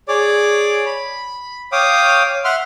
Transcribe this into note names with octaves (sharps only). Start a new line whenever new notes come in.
G#4 C#5 D5 D6
B5
C#5 F5 G5 D6 D#6
E5 F#5 C6 F6